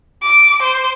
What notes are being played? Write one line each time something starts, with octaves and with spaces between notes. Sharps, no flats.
D6
C5